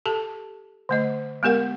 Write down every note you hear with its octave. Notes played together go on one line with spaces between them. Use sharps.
G4 A4 A5
D3 A3 D#5
G#3 B3 G4 A#4 F#5